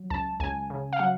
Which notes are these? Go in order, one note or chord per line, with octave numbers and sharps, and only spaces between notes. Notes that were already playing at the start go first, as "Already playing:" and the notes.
Already playing: F#3
C#2 A5
C#2 G#5
C#3
F5
F#3 F#5